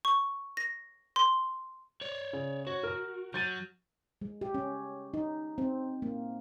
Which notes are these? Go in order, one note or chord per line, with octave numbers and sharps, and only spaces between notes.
C#6
A#6
C6
C#5 D5
C#3
F#4 C#5
A#4 F6
F#3 G6 A6 D#7
G#3
G4
C#4
D#4
C4
A#3